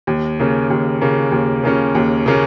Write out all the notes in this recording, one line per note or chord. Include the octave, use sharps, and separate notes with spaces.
D#2
C#3 A#3 C#4
D#2
C#3 A#3 C#4
D#2
C#3 A#3 C#4
D#2
C#3 A#3 C#4